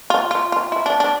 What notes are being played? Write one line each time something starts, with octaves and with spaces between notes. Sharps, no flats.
F4
F4
F4
E4
D4
D4